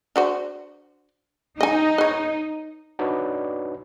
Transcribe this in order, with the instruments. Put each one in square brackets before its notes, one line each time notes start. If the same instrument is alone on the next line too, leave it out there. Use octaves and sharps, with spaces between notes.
[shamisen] D4 F#4 C5
[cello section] D#4 [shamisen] D#5 G#5
[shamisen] B4 C#5
[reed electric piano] D4 D#4 F#4 B4 C#5 D5